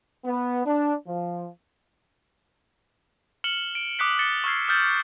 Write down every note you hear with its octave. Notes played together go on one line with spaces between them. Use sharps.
B3
D4
F3
F6 C#7 E7 F#7 G7
D7
D6 D#6 F#6 B6 C#7
A6 C#7 E7 G7
C#6 E6 F6 G#6 C7
D#6 F6 G6 A6